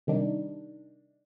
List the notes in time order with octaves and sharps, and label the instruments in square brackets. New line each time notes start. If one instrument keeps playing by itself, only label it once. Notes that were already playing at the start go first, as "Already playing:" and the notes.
[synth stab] C3 D#3 G3 D4 D#4